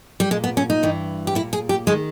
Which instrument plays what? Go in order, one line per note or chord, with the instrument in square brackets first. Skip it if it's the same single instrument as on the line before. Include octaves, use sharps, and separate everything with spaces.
[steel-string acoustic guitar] G3
A#2 G#3
B3
C#4
D#4
G2 E3
G4
A#2 E4
G#4
G4
D#3 G#3